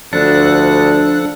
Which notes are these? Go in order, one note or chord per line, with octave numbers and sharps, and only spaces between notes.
D2 F3 D4 A4 F#6